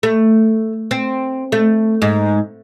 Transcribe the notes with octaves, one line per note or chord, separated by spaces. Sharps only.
A3
C4
A3
G#2